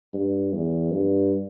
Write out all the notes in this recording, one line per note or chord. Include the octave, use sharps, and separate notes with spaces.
G2
E2
G2